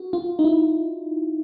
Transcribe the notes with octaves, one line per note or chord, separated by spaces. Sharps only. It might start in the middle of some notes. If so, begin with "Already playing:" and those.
Already playing: F#4
F4
D#4
E4